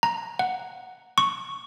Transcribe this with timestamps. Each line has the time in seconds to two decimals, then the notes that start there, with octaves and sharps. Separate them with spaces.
0.03 A#5
0.39 F#5
1.18 C#6